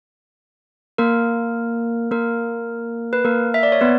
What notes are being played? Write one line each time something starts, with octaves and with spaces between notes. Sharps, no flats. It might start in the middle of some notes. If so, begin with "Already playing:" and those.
A#3 A#4
A#3 A#4
B4
A#3 A#4
E5
D5
C#5
B3 B4